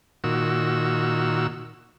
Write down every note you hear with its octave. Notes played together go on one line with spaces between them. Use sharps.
A#2 D#3 F#4 E6